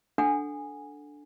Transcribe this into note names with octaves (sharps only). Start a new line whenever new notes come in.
D4 A4 F#5 G#5